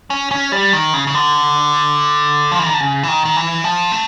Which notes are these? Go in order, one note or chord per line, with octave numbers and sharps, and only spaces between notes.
C#4
C#4
G3
D#3
C#3
C#3
D3
F3
E3
D#3
D3
C#3
E3
D#3
D#3
E3
F3
A3